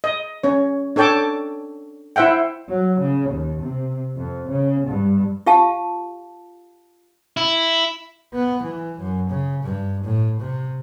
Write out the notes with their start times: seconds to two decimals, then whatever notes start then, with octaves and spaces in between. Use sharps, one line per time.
0.04 D#5
0.43 C#4 C#5
0.96 D4 A4 C#5 G5 A5 D6
2.16 E4 C5 E5 F#5 G5
2.69 F#3
3.01 C#3
3.30 D#2
3.62 C3
4.16 F2
4.50 C#3
4.88 G2
5.47 F4 G4 F5 A5
7.37 E4
8.34 B3
8.63 E3
8.98 F#2
9.29 C#3
9.63 G2
10.04 A2
10.40 C3